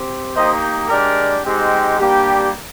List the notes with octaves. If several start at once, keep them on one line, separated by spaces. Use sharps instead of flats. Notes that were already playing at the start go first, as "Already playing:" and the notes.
Already playing: C4 G4
A#3 D#4 G4 C5 D#5
G#3 D4 G4 A#4 D5
G#3 C4 D#4 G4
G3 A#3 D4 G4